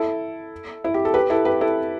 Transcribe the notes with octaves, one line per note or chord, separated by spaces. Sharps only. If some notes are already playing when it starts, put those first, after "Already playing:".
Already playing: E4 A4
E4
G4
A4
G4 B4
E4 A4
G4 B4
E4 A4